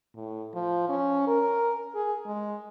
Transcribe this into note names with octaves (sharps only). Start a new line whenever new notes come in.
A2
F3
C#4
A#4
G#4
G#3